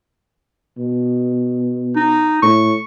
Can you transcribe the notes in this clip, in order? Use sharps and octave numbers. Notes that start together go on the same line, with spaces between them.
B2
D#4
A2 C#6